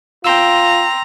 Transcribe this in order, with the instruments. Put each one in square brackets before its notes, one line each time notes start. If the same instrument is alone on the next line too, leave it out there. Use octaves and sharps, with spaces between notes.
[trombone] F4 [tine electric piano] G5 C6 E6 [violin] A#5